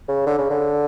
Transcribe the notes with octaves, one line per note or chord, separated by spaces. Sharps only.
C#3
D3
C#3
D3